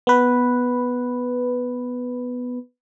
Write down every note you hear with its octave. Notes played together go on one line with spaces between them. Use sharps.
B3 B4